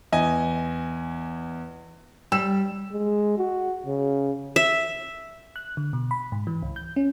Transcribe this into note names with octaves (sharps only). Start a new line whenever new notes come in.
E2 D#5 G#5
G3 E6 E7
G#3
F#4
C#3
E5
F#6
D3
B2
B5
G#2
E3
C#2
G6
C#4